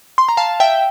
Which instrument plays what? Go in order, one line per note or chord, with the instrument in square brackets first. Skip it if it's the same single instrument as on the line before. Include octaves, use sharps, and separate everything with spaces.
[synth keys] C6
A#5
F5 A5
E5 G5